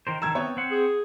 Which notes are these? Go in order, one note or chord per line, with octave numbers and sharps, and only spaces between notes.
D#3 A#4 C5
D#3 G3 A5 A#5 E6 G#6
B3 C4 C#5
C4 C5 F#5
G#4